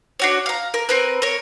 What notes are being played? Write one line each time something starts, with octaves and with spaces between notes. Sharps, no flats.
D4 F#4 C#5
F5 A#5
A#4
C4 A#4 B4
A#4 C#5